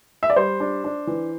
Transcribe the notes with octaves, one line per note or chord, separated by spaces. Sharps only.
E5
D5
G3 C5
D4
D4
E3